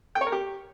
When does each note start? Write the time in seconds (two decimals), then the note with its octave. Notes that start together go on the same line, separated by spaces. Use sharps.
0.15 G5
0.21 C#5
0.27 A#4
0.32 G4